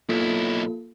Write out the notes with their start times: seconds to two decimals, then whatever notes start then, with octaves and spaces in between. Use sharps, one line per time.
0.09 B1 A#3 E4 F4 A4